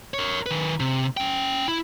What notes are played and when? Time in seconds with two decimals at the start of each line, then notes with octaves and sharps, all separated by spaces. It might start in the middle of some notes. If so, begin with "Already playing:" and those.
0.14 A#4 C#5
0.46 D#3 B4
0.80 C3
1.17 C#4 G5
1.68 E4